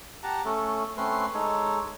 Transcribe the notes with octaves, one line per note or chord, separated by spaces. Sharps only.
G4 F#5 A5 A#5
A3 C#4 A4
A3 C4 C#4 B4 C6
G#3 D#4 A4 C#5